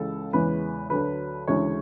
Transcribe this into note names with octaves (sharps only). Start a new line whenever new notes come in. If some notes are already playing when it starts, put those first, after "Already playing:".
Already playing: C#2 C#3 E3 G#3 A4
E2 C#3 E3 G#3 B4
D2 D3 F#3 B4
D2 C#3 E3 G#3 C#5